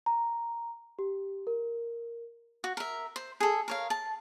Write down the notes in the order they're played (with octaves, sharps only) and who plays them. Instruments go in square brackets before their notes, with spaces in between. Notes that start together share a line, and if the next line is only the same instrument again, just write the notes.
[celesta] A#5
G4
A#4
[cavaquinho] F#4
A#4 E5
C5
G#4 A4
A#4 C#5 F5
A5